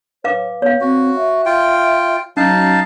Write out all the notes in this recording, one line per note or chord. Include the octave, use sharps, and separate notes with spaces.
B4 C#5 F5 D6
B3 C#5 F5
C4 F#4
E5
F4 G5
F#3 C#4 D#4 F5 A5